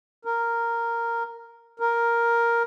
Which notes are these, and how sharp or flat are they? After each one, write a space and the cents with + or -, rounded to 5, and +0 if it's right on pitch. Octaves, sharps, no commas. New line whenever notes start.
A#4 -5
A#4 +5